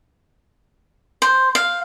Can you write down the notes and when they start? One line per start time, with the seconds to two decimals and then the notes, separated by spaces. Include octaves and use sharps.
1.22 C5
1.55 F5